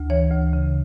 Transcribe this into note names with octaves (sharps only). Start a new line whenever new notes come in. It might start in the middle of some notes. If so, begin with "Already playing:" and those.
Already playing: D2
E3 C#5
D2
C#3